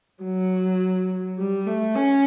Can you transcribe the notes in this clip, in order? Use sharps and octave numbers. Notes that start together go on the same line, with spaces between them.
F#3
G3
A3
C#4